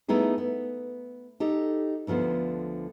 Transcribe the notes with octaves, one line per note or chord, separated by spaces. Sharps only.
A3 B3 D#4 E4 G#4
B3
D#4 G4 A4
D2 D3 F3 B3 C5